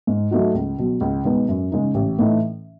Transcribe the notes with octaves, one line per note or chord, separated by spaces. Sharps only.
G#2
F#3 A3 D#4 F#4
C#2
B2 F#3
C#2
B2 G#3 B3 D#4
F#2
C#3 G#3 D#4
A1
A2 E3 A3 D#4